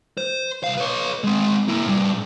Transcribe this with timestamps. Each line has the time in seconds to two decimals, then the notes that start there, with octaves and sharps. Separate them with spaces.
0.17 C5
0.64 C2 F5
0.78 B4 C#5
1.24 G#3 C4
1.68 A#3 E4
1.86 A2 G3